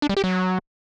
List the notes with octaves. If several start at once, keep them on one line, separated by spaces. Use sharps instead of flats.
D4
G3
G4
F#3